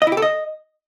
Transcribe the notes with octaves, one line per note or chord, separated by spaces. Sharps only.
D#5
E4
G4
A4
D#5